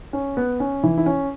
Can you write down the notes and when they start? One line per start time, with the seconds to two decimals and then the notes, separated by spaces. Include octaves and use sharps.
0.13 C#4
0.37 B3
0.60 C#4
0.83 E3 E4
0.98 E4
1.06 C#4